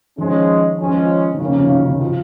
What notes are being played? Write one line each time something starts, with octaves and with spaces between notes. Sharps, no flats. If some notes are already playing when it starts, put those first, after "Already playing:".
D#3 F3 G#3 C#4
F3 G#3 C#4
D#3
C#3 F3 A#3 C#4
C3
D#3
C#3
D#3
F3